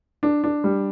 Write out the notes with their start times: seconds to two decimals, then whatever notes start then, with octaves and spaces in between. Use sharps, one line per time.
0.23 D4
0.44 D4
0.64 G3